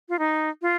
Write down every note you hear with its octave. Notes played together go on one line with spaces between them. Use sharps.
F4
D#4
F4